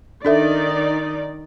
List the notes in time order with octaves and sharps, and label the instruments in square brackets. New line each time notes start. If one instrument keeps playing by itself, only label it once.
[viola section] D#3 D#4 D5 [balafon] D4 A4 E5